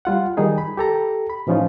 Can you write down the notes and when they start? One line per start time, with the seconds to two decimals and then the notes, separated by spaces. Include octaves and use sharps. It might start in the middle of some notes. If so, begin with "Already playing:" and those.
0.05 G3 F4 F#5
0.37 D#3 G3 D#4 G#4
0.58 B5
0.77 G4 A4 A#5
1.30 B5
1.47 A2 E3 F3 C#4 D#4 F4